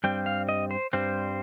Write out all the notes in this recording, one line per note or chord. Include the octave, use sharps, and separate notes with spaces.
G2 G3 C4 G5
F5
D#5
C5
G2 G3 C4 C5